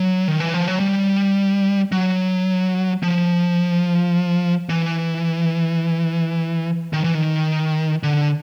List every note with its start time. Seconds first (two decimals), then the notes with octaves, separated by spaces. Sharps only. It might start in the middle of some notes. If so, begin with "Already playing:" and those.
Already playing: F#3
0.28 D#3
0.40 E3
0.54 F3
0.68 F#3
0.80 G3
1.92 F#3
3.03 F3
4.69 E3
6.93 D#3
7.04 E3
7.15 D#3
8.03 D3